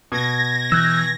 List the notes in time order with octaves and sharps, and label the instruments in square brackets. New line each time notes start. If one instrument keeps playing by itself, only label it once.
[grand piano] B2 [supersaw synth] G#6 A#6
[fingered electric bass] E3 [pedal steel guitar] E6 F#6 G6